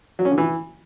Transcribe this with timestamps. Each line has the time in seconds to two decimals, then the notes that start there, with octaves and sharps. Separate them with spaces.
0.19 F#3
0.25 C#4
0.31 D3
0.38 E3